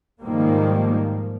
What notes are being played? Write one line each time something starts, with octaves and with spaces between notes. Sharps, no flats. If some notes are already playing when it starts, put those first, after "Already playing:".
G#2 D#3 F3 G3 A#3